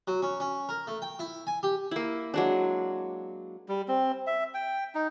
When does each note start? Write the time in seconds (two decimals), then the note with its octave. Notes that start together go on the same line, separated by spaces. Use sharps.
0.08 F#3
0.22 C#4
0.40 C#4
0.69 A#4
0.87 A3
1.02 G5
1.19 E4
1.47 G#5
1.63 G4
1.91 A#3 E4
2.34 F#3 G#3 D4
3.68 G3
3.88 C4
4.27 E5
4.54 G5
4.95 D#4